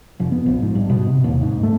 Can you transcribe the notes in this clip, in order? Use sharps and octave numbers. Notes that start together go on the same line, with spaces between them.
F1
B3
A#1
G#2
G2
B2
C3
D#2
G#2
A3